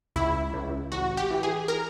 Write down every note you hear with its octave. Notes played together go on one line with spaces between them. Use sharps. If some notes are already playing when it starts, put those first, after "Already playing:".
C#2 E4
C#2
A1 F#4
G4
E3
G#4
A#4